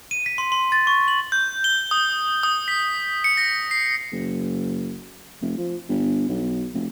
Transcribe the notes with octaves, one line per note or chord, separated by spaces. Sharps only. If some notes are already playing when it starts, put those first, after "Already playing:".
D#7
B6
C6
C6
A6
C#6
F#7
G6
G7
D#6
D#6
B6
C#7
A#6
C7
F#1
F1
F3
G1
B1
F1